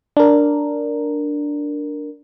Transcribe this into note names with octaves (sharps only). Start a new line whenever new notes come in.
D4 A#4